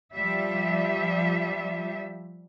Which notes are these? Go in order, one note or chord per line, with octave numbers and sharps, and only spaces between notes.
F3 G3 E5